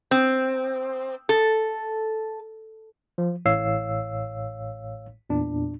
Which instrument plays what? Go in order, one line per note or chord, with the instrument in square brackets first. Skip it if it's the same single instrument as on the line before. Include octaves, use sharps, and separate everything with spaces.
[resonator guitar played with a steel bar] C4
A4
[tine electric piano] F3
A1 A2 C#5 F5 E6 C7
E2 A#2 D4